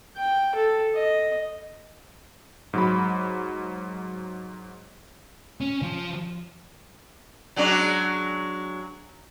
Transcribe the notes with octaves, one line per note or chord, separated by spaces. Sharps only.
G5
A4
D#5
G#2 F#3 B5
C#4
F3
F#3 G#3 D4